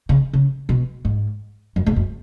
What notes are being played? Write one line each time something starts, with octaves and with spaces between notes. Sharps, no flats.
C#3
C#3
B2
G#2
F#2
G#2
F#2